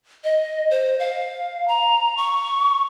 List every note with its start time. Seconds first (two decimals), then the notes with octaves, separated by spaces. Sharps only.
0.24 D#5
0.71 C5
0.99 F5
1.68 A#5
2.17 C#6